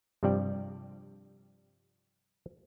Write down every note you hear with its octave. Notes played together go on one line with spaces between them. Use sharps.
G2 C3 F3 G3 D5 G5